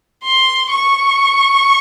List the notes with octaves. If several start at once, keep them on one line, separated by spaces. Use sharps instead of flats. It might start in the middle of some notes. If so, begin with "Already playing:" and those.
C6
C#6